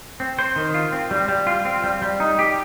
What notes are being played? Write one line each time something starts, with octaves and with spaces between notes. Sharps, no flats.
C4
C5
D#3
F4
C4
G3
G3
F4
C4
G3
G3
D#4
G4